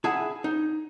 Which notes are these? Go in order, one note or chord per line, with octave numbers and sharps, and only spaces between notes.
E4 G#4 E5 F#5 G#5 A5
D#4